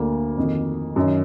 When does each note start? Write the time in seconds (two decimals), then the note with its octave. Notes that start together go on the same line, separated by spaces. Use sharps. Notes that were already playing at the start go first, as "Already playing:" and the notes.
Already playing: D2 D3 A#3
0.37 F2 D#3
0.96 F#2 D#3